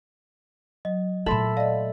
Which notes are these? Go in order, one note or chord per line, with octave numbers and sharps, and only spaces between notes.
F#3 D#5
A#2 A3 A4 E5 B5 C6 F#7
D5 D#5 F5